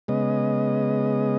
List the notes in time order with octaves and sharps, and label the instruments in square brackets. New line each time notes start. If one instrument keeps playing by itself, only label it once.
[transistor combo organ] C#3 G#3 B3 D#5